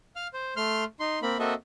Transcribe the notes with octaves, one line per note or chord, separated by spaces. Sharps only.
F5 F6
C5
A3 C6 F6
D#4 C6
A#3 C4 B5
A#3 C4 F#4 A4 D#5 E5